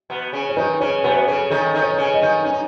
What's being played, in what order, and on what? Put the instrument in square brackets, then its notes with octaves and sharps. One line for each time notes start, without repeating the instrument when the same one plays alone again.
[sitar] B2 B3
C#3 C#4
[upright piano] C#5
[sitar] D#3 D#4 [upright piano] B4
[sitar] C#3 C#4 [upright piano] C#5
[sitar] B2 B3 [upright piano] B4
[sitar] C#3 C#4 [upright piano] A4
[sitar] D#3 D#4 [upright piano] A4
[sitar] D#3 D#4
[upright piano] C#5
[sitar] C#3 C#4
[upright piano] D#5
[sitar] D#3 D#4
[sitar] C#4 [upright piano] G#5
[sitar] D#4